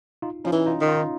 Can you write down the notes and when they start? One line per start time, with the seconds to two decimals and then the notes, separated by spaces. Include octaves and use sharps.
0.22 D#4 F4
0.45 F3 C#4 D#4
0.52 E3
0.66 D#4 F4
0.81 D#3
0.88 D#4 F4